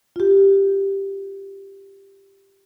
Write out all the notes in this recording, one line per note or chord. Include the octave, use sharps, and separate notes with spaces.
F4 G4